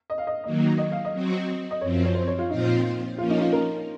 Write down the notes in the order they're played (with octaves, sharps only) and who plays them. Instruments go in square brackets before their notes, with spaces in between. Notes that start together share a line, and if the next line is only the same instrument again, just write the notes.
[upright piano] D#5
F5
D#5
[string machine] D#3 F#3 A#3 [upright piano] D#5
[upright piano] D#5
F5
D#5
[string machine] F#3 C4 F#4
[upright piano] D#5
[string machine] F#2 F3 C4 [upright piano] C#5
[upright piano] C#5
C5
C#5
F4
[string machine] A#2 F3 C4 F4 C5 [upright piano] D#4
[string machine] F3 A#3 C#4 [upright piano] F4
[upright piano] D#4
F4
A#4